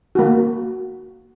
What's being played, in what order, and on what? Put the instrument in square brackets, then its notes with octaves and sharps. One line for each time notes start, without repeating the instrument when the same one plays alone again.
[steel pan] A#3 F#4